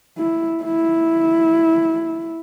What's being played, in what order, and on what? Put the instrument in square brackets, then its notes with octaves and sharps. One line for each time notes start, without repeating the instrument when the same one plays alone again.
[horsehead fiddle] E4
E4